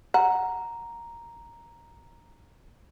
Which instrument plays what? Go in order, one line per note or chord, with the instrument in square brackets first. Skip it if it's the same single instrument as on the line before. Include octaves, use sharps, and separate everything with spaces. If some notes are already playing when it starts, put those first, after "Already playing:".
[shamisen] F#5 [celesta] A#5